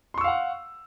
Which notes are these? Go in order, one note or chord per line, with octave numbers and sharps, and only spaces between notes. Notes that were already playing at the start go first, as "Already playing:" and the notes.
F5 F#5 C6 C#6 E6